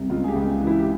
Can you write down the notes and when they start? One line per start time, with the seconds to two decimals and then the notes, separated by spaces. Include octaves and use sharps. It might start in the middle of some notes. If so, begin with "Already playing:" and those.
Already playing: C2
0.10 C#2 F4
0.24 G#4
0.28 G4
0.36 C#2
0.61 E3
0.67 E4
0.80 G4